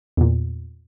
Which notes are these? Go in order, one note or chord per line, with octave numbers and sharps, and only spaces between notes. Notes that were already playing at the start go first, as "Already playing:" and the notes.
E2 A#2